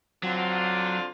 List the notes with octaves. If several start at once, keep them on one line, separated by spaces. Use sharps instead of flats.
D3 F#3 C4 F4